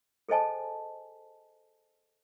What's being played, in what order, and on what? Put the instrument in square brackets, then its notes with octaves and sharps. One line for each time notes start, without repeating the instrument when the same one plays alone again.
[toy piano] G#4 A4 C5 D#5 G#5 A5